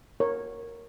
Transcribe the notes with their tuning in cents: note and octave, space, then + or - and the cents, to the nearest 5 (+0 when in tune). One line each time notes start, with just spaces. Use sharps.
A#4 +0 C#5 -10